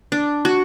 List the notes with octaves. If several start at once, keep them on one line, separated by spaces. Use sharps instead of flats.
D4
F#4